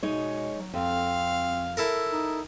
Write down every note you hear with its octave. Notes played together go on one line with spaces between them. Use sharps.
B2 G#3 D#4 C#5
F#3
F2 C4 F5
E4 A4 A#4
D#4